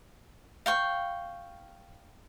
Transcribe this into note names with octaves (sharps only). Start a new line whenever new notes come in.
F5 G5 C#6